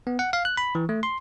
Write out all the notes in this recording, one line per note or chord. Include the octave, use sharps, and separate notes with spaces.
B3
F#5
F5
F#6
B5
E3
A3
C6